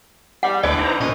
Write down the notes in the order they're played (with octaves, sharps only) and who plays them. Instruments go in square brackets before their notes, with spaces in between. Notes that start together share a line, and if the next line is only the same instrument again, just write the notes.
[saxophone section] E2 G3 [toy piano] F#5
[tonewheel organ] D2 G5 D6 [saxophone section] D3 E3 B3 [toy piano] D5
[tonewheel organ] D#4 C5 A#5
[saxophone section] D2 C#5 D#5 [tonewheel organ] A#2 C#4